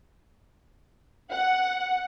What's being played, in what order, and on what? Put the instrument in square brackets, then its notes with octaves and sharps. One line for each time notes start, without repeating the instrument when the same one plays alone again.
[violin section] F#5